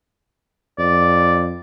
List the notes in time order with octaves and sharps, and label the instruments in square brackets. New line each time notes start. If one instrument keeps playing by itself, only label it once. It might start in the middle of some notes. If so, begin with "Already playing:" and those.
[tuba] F2 [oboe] D5